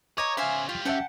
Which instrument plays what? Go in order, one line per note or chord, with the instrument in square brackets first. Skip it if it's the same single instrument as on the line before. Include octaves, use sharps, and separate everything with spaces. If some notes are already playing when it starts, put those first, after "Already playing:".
[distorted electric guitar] C#5 [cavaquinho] D#5 A#5 [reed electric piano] C#6 D6 G#6
[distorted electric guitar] C#3 C5 [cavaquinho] E5 F5 G#5
[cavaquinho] F4 [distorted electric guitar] G4 F5
[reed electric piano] C#4 E5 [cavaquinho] F#5 G5 A5